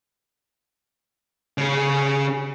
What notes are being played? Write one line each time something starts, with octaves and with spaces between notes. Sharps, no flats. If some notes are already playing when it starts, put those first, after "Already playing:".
C#3 C#4